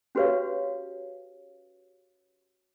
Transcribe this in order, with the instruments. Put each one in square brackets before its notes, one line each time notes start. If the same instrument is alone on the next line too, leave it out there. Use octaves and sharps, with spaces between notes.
[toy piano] C#4 F#4 G4 B4 C#5 F5